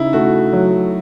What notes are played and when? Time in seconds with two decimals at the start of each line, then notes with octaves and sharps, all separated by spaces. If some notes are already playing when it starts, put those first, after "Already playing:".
Already playing: C#3 D#4 E4
0.13 A3 F#4
0.53 F#3